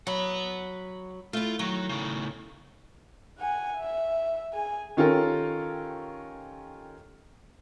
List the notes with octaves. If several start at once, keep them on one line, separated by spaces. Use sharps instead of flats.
F#3 F#5 B5
A3 E4 F4
D#3 F#3
A2 C#3
F#5 G#5
E5
G#4 G#5
D#3 C#4 F4 G4 A4 A#4